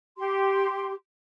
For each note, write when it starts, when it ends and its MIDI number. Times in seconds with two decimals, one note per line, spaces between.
0.17 0.92 67
0.17 0.92 84